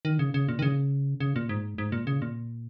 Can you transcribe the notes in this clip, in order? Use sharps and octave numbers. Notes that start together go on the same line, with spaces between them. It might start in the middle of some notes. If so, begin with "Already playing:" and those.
D#3
C#3
C#3
A#2
D#3
C#3
C#3
A#2
G#2
G#2
A#2
C#3
A#2